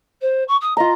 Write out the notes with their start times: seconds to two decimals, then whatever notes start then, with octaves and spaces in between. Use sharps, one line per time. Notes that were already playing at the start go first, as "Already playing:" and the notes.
0.21 C5
0.48 C#6
0.61 D#6
0.77 F4 D#5 A#5